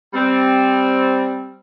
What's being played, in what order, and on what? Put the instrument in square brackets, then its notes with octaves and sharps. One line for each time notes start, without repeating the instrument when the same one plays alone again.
[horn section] G3 C4